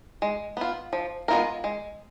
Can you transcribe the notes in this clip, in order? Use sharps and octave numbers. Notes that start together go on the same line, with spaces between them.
G#3
B3 F4
F3
G#3 B3 F4 A#4
G#3